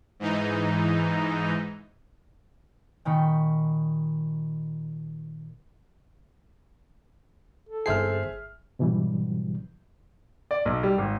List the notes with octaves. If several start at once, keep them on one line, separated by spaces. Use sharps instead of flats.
G#2 E3 D#4
A#2 D#3 D#4 B5 C#6
A4
G1 G#4 C5 E5 F6 C7
G#2 B2 D3 E3 F#3 G3
D5
B1
G3
G#1